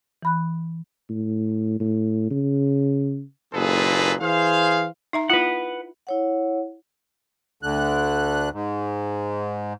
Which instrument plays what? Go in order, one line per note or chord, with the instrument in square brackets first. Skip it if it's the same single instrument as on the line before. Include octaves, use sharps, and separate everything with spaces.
[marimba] E3 B5 F#6
[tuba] A2
A2
C#3
[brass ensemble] F#1 D#2 A#2 G#4 A4 B4
E3 G#4 C5 F5
[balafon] D#4 E5 A#5
[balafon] E4 F4 [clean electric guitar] B4 F#5
[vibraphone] E4 C#5 F#5
[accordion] D2 D3 F#6
G#2